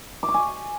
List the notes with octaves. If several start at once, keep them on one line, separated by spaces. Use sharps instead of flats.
D6
C#6
G#5